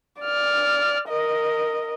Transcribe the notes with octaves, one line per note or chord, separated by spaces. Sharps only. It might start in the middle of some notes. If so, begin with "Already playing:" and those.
D5 F6
A#4 D#5